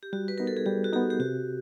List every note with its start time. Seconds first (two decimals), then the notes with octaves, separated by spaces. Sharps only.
0.03 G4
0.13 G3 F#4
0.28 B4
0.38 B3 D#4 A#4
0.47 A4
0.57 G#4
0.66 G3 G4
0.84 F#4
0.93 B3 D#4 G4
1.10 G4
1.20 C3 F#4